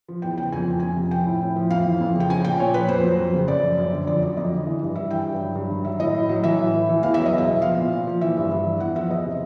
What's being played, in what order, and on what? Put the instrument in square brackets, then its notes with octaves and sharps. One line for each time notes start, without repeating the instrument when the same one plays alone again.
[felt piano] F3
E2 G5
C#3 G5
F2 G#5
F3
F2 G#5
C3
F3 G5
A2
A2
F3
F2 F5
E3
F2
C#3
G5
F3 G#5
A#2 G5
A#2 C#5
F3 B4
F2 C5
F#3
F2
C#3
F#2 D5
F3
F#2
D3
F2 D5
F#3 D5
F2 D#5
D3
E3
G2
G2 E5
E3 G5
G2
F#3
G2
D#3
F#3 E5
A2 D#5
A2
F#3
E3 E5
A2
A2
E3
E2 F5
F#3 E5
D#5
E2
E5
B2
F3 F5
A#2
A#2
F3
E3 E5
G2
G2
E3
E2 F#5
F3 E5
E2 D#5
C3